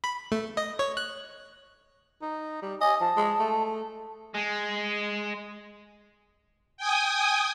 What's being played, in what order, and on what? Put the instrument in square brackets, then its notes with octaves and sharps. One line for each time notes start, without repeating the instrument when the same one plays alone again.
[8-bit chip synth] B5
A3
D#5
C#5
F#6
[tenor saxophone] D#4
G3
[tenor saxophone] D#5 [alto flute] G#5
[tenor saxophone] F3 [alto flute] A5
[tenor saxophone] G#3
A3
[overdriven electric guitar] G#3
[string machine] G5 G#5 D#6